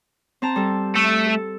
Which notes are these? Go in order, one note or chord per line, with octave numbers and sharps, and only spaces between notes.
C4 A5 A#5
G3 A4
A3
A4